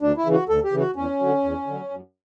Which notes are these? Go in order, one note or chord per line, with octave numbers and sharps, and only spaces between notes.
D2 D4
E4
C#3 E3
F#4
D2 A4
G4
C#3 E3
F#4
E2 C#4
D3 F#3
E2
D3 F#3
F#2